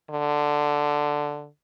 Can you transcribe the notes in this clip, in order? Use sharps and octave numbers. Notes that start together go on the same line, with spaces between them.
D3